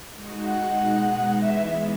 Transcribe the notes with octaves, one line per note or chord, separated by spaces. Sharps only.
G#3 D#4 F#4
F#5
B2 G#3 D#4
E3 G#3 B3 E5